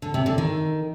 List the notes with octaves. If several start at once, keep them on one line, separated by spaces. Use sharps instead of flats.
D3
C3
D3
D#3